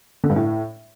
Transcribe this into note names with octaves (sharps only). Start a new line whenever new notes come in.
D3
G2
A2